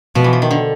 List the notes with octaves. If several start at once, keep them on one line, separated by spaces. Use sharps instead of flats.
B2 F3
E3
F3
D#3
D3